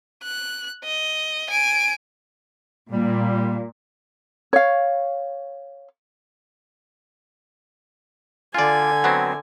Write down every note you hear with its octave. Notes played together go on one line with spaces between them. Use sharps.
F#6
D#5
G#5 D7
A#2 G3
C#5 F5
D3 F4 D5 G#5
F#3 B3 C4